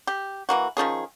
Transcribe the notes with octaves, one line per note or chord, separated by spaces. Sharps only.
G4
E3 A#3 F#4
D#3 F3 C#4 G#4